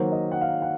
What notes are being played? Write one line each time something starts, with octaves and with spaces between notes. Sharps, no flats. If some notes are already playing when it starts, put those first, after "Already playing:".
Already playing: D#3 F#3 A#3 C5
D#5
F#5
F5
F#5